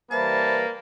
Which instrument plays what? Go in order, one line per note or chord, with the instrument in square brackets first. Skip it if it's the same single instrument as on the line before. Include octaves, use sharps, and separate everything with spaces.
[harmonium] E3 G3 B4 [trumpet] A#3 [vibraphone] C5 E5 B5 [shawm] A5